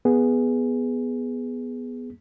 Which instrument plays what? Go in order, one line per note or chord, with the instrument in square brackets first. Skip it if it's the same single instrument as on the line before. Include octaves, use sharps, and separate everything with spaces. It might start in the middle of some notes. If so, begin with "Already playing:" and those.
[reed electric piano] B3 G#4